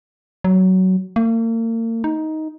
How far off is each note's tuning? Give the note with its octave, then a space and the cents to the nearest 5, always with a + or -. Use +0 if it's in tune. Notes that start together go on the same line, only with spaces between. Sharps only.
F#3 +15
A#3 -40
D#4 +10